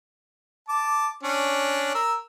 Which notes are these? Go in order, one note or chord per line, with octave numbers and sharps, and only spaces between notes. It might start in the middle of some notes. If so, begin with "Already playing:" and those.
A5 D6
C#4 D4
A#4 E6